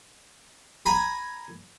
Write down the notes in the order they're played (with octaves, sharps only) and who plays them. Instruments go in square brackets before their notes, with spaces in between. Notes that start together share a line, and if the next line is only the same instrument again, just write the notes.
[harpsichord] G#5 A#5 B5